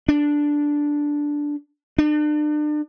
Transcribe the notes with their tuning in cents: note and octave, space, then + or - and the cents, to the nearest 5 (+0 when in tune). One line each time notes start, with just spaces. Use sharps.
D4 -5
D4 +40